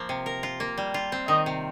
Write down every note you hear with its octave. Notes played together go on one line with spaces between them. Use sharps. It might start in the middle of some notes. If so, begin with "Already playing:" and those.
Already playing: F3 A#3
C3
A#4
F4
A#3
G3
F4
C4
D#3 D#5
C3